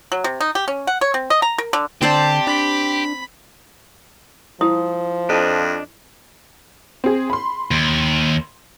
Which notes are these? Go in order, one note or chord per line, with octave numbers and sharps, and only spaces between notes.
F#3
C3
D#4
G4
C#4
F#5
C#5
C4
D#5
A#5
A#4
D3
D3 C4 G4 C5 D5 A5
D4 B5
F3 E4 D#6
F2 D4 D#5
C4 G#4
B5 C6
D#2